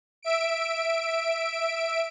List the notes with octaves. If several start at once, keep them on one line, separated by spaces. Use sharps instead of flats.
E5 D7